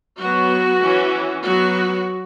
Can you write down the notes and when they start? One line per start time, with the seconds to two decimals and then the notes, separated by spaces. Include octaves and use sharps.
0.20 F#3 B3 F#4
0.82 E3 C#4
1.43 F#3 B3 F#4